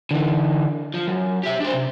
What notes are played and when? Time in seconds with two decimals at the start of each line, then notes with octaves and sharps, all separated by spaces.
0.11 D3 E3
0.94 F3
1.07 F#2
1.43 G4 E5
1.60 D4 C5
1.74 C3